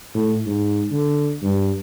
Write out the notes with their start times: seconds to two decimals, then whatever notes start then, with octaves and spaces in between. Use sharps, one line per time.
0.14 A2
0.46 G#2
0.92 D3
1.42 G2